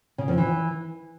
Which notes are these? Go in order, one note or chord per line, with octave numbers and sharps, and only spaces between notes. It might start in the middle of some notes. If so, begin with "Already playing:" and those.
C#3
F2
E3